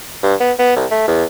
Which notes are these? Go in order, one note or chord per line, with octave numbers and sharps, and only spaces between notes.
G2
B3
B3
C2
A3
E2